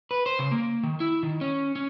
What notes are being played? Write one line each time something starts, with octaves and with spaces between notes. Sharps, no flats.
B4
C5
C#3
A#3
D#3
E4
D#3
C#4
C#4